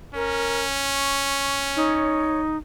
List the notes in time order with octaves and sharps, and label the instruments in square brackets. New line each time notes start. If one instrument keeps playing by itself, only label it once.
[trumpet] C#4 [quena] A#4
[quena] C#6
[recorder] D#4 [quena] C#5